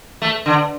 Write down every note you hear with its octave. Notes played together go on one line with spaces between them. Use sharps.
A3
D3